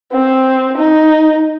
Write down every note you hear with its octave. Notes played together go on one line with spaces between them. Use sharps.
C4
D#4